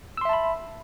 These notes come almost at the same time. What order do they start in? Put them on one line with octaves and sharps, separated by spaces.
E6 C6 E5 A5 B5